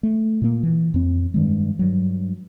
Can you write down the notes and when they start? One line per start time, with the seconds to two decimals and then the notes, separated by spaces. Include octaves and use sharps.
0.03 A3
0.42 A#2 A#3
0.63 E3
0.94 F2 C4
1.34 G2 D#3 G#3
1.79 G2 F#3